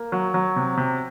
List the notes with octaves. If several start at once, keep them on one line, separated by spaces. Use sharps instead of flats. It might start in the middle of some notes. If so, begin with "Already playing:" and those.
Already playing: A#3
F#3
F#3
C3
C3